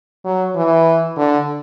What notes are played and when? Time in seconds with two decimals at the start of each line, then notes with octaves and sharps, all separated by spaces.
0.25 F#3
0.55 E3
1.17 D3